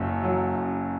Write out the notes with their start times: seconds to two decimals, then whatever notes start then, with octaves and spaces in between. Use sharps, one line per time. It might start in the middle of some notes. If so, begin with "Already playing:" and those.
Already playing: F#1 F#2 F#3
0.24 F#3
0.55 F#2